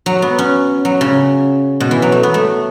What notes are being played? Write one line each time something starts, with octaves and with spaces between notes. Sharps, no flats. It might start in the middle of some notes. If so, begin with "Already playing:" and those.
F#3
B3
C#4
F#3
C#3
B2
E3
F#3
A3
B3
A3